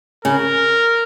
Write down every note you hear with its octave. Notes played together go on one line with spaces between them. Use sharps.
C#3 A#4